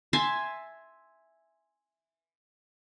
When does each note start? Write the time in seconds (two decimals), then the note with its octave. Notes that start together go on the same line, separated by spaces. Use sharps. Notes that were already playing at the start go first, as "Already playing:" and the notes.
0.13 E5 G#5 A5 C6